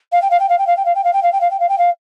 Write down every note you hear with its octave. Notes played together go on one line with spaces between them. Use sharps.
F5
G5
F5
G5
F5
G5
F5
G5
F5
G5
F5
G5
F5
G5
F5
G5
F5
G5
F5